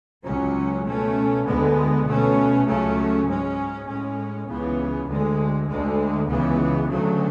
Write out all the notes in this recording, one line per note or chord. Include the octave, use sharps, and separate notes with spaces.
C#2 C#3 F#3 C#4
B2 A3 C#4
D2 D3 G#3 B3
B2 A3 C#4
C#2 C#3 F#3 A3 C#4
G#2 G#3 C#4
A2 G#3 C#4
C#2 C#3 E3 B3
D2 D3 G#3
D2 D3 G#3
C#2 C#3 E3 B3
D2 C#3 F#3 A3